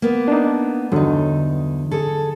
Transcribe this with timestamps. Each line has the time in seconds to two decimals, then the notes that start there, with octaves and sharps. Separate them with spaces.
0.02 A#3 B3
0.28 D4 D#4
0.92 E2 G2 D3 F#3 D#4
1.91 G#4 A4